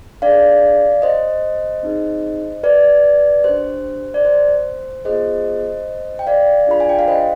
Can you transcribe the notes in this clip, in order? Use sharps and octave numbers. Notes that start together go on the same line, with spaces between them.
D4 G#4 D5 F5
C5 D#5
C4 D#4 G#4
B4 D5
D4 G4 C5
D5
C5
B3 F4 G#4 C5 D#5
G5
D5 F5
D4 F4 G#4 B5
G#5
G5
F5
C5 D#5